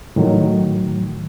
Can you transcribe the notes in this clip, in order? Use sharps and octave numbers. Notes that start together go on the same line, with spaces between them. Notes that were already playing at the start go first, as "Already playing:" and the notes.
A2 D#3 F#3